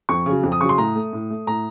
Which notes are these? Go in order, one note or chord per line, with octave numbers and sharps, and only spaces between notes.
F2 C#6
C#3 F#3
F2
D#6
C#3 F#3 C#6
C6
A2 A#5
A3
A2
A3
A2 A#5